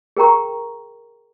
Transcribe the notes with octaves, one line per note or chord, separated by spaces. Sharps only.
G#4 A#4 G5 A#5 C#6